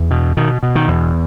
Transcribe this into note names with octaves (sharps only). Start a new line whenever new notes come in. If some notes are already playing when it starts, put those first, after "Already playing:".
Already playing: E2
B2
B2 D#3
B2
D#3
E2